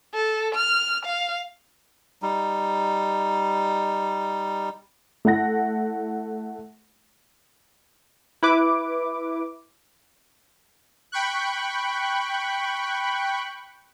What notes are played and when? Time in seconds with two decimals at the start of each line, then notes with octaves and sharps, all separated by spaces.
0.14 A4
0.55 F6
1.06 F5
2.22 G3 D#4
5.25 A3 E4 F#5 A#6
8.43 E4 B4 D6
11.12 G5 B5 C#6 F#6